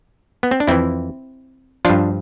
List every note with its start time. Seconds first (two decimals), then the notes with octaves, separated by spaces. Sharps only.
0.43 B3
0.51 C4
0.60 D4
0.67 F2 E3 C4 E4
1.85 G2 F3 D4 F4